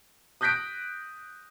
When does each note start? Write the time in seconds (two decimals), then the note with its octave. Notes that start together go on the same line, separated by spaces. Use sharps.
0.41 D#6 F#6 G6 A#6 B6 D7